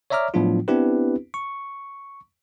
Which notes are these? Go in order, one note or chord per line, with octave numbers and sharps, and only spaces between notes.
C#5 D5 E5 A#5 D6 F6
A2 F3 F#3 B3 D4 F4
B3 C4 D4 E4 G4 B4
C#6